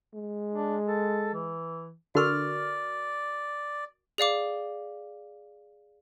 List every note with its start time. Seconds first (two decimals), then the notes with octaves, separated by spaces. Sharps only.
0.14 G#3
0.55 D4
0.88 A4
1.34 E3
2.15 D3 F#4 A#4 D5 C#6 F6
4.18 G#4 D5 F5 D6